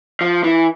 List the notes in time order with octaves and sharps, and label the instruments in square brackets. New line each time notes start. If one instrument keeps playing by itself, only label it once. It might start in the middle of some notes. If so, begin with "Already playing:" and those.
[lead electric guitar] F3
E3